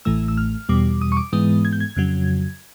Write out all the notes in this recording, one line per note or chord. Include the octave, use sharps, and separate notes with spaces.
A1 A2 E3 A3 E6
E6
F6
E2 B2 G3 D6
D#6
C#6
D6
G#2 E3 G#3 B3 D#6
G#6
G6
G#6
F2 C#3 F#3